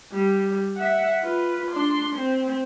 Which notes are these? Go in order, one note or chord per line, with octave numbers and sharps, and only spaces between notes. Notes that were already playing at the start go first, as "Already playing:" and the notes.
G3
E5 F#5
F4 B4
D4 C6
C4